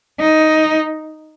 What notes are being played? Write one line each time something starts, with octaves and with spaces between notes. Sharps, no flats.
D#4